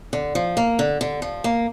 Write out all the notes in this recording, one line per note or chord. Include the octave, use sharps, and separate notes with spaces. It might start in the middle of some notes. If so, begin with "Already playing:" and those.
D3
F3
A#3
D3
D3
F3
A#3